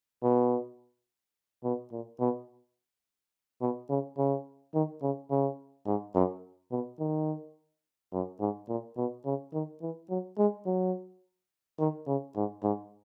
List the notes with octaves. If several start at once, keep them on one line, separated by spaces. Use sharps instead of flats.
B2
B2
A#2
B2
B2
C#3
C#3
D#3
C#3
C#3
G#2
F#2
B2
D#3
F#2
G#2
A#2
B2
C#3
D#3
E3
F#3
G#3
F#3
D#3
C#3
G#2
G#2